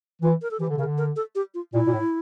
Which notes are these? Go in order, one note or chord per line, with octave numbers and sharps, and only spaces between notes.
E3 F4
A#4
A4
E3 G4
D3
C#3 A#4
D3
A#4
A4
G4
F4
A#2 E4
A#2
A2